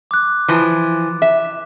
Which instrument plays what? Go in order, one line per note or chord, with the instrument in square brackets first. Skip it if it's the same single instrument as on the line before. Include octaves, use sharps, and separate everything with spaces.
[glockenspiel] D6 F#6
[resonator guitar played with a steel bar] E3 F3
E5